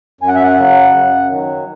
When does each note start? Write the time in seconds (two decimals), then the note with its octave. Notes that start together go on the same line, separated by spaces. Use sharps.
0.21 F#2 G#5
0.28 F#5
0.36 E5
0.43 F#5
0.57 C#3 F#3
0.93 F#2
1.29 D#3 F#3